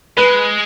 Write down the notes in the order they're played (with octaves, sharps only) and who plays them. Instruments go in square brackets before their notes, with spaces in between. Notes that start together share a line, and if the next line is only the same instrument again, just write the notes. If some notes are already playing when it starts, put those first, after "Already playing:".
[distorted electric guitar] G#3 [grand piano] B4